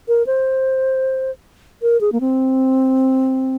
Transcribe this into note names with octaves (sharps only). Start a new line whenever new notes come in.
A#4
C5
A#4
G#4
A#3
C4